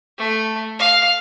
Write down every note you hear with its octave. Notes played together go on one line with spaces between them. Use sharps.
A3
F5